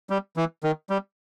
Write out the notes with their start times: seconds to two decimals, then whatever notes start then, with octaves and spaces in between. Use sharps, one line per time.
0.10 G3
0.37 E3
0.64 D#3
0.90 G3